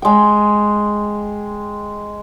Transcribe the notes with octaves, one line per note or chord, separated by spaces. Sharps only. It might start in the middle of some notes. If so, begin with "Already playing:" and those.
G#3 G5